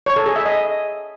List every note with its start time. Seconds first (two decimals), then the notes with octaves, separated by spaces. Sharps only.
0.06 C#5
0.16 A4
0.26 G#4
0.36 E5
0.46 D#5